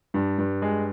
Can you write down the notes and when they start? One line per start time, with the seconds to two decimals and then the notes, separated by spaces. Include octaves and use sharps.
0.14 G2
0.38 G2
0.62 G#3